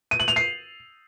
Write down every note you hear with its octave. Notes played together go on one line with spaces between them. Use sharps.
D#7
F#7
F7
C7